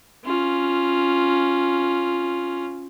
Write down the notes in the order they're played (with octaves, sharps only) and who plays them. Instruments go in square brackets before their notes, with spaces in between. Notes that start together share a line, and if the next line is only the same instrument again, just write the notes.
[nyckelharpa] C#4 F4